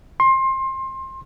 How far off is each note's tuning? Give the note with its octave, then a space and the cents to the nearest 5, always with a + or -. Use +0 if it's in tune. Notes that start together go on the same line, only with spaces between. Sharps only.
C6 +25